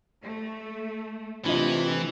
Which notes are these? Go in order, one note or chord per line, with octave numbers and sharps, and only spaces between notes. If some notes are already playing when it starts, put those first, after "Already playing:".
A3
C3 E3 A3 D4 F4 D#5